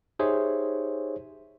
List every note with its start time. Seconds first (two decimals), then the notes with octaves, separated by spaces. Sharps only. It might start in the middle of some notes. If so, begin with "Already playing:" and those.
0.19 D#4 G4 G#4 C5 C#5 E5